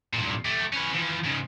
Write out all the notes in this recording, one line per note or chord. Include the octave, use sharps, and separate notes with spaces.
G2 A#2
A3 G4
C#4 B4
E3 F3
G#2 C#3